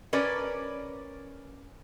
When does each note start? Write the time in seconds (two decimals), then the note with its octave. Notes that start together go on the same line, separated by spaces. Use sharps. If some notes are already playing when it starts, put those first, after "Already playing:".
0.13 C#4 A#4 B4 D5